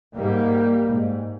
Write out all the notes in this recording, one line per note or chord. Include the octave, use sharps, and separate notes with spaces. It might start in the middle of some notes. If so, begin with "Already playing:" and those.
G#2 G3 A#3
G#2